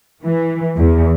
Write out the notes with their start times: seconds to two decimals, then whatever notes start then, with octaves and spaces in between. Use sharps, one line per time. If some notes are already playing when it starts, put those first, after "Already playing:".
0.23 E3
0.76 E2